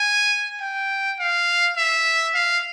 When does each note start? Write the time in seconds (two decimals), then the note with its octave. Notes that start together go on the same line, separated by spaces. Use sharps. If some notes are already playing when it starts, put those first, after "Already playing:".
Already playing: G#5
0.60 G5
1.20 F5
1.77 E5
2.35 F5